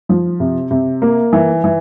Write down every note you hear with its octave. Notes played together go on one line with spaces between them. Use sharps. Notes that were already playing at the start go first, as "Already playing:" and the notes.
F3
C3
C3
A#3
E3
E3